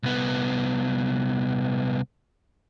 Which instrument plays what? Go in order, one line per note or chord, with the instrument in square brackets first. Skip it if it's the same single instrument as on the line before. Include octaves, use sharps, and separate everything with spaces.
[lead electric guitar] C2 B3